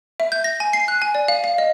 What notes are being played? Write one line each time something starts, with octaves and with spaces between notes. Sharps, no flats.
E5
G6
A#6
G#5
C7
F#6
G#5
D5
F5
F5
D#5